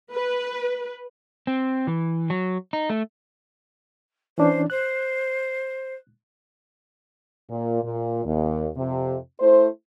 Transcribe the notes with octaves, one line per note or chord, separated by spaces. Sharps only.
B4
C4
E3
F#3
D#4
A3
E3 C#4 D4 C5
C5 F#6
A#2
A#2
D#2
F2 C3
A3 E4 C5